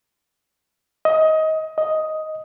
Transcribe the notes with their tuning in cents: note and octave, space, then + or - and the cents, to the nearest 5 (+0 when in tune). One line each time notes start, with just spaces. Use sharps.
D#5 +20
D#5 +5